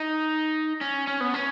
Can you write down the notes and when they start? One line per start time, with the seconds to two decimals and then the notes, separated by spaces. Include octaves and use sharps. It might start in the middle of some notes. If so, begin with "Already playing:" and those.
Already playing: D#4
0.81 C#4
1.07 C#4
1.21 B3
1.34 C#4